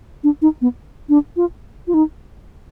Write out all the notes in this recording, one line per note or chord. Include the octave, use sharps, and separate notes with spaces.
D4
D#4
B3
D4
F4
F4
D#4